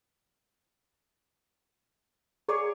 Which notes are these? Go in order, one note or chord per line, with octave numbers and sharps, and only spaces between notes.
G#4 C#5 D5 C#6